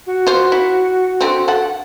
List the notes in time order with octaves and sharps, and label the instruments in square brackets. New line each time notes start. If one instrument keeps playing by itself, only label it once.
[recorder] F#4
[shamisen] F4 C5
E4
D3 C4
A4 F#5